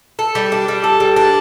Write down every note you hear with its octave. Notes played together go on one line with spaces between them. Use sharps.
A4
G3
D4
G3
A4
G3
D4